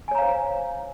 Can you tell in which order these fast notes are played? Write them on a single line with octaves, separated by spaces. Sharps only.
G#5 C#5 A#5 F5 C5